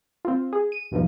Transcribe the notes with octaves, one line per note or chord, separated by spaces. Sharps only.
C4 F4
G#4
D#7
E2 G2 B2 D#3 F3